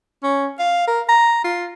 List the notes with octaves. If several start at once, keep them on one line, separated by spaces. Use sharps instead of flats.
C#4
F5
A#4
A#5
F4